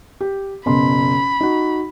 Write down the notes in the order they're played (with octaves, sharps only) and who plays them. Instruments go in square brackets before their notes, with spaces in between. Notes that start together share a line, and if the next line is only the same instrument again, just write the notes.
[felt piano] G4
[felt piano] F#1 B2 C6 [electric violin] B5
[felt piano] D#4 F#4